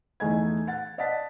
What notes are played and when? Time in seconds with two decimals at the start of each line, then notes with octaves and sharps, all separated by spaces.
0.20 E2 A3 D#4 D#5 G#5 G#6
0.67 F#5 A6
0.98 D5 D#5 F#5 A5 A6 B6